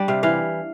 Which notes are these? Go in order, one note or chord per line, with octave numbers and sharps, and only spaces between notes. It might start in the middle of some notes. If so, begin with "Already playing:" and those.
Already playing: G3 D4 D5
C3 F5
E3 F5